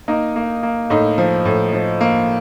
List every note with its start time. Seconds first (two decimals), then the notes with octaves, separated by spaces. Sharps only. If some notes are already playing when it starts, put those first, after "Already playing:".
0.08 A#3 D#4
0.36 A#3
0.63 A#3
0.90 A2 D#4
1.18 F3
1.45 A2
1.73 F3
2.01 A#3